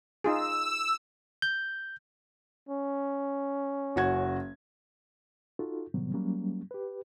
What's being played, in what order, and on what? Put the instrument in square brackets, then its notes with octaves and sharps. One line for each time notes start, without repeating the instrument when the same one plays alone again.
[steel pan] D#4 F4 G#4 [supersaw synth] E6
[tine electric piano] G6
[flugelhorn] C#4
[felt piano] F#1 F#4 G#6
[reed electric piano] D#4 F4 F#4 A4
A2 C3 D#3 F#3 G3 B3
F#3 G3 A#3 C#4
G4 B4